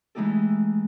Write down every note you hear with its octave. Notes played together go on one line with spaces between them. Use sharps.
E3 G#3 A3 D#4 G4 A4